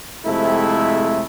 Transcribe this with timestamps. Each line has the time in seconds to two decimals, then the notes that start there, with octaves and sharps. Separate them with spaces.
0.25 F2 C3 G#3 A3 E4